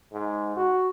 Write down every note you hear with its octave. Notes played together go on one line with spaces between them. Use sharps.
G#2
F#4